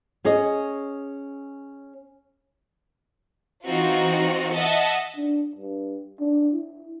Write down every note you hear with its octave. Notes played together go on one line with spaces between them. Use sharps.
C#4 G#4 C#5 D#5
E3 C4 D#4 F4 F#4
D#5 E5 F#5 A5
D4
G2
D4
E4